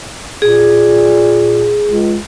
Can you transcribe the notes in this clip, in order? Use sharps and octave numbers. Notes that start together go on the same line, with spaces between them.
A#2 G#4
C#2